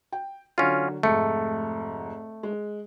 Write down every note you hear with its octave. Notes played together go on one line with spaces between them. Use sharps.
G5
D3 F#3 C#4 F4
F1 G#2 A3 C#7
G#3